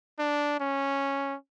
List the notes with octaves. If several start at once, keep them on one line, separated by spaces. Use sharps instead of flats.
D4
C#4